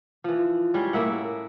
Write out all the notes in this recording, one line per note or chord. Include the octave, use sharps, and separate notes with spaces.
E3 F3
G3 G#3 C#4
A2 A#3 E5 F#5